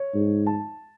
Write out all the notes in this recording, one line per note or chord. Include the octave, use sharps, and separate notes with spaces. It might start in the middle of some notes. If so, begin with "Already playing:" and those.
Already playing: C#5
G#2
A5